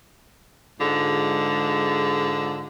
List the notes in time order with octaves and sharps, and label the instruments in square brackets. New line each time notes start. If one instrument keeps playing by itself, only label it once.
[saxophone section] G#2 D3 G#3 F4